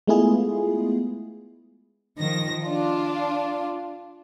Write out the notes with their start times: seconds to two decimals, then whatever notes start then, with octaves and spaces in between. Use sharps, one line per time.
0.07 G#3 A3 B3 E4 F4 G#4
2.20 D#3 F3 A#6
2.64 D4 F4